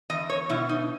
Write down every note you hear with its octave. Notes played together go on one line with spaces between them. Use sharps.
E2 D#5
C#5
B2 E4
D#4